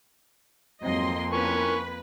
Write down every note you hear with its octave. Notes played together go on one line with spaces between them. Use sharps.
F2 G#2 F#3 A#3 C4 D#5 C6
E4 F4 A#4 B4 G#5 C#6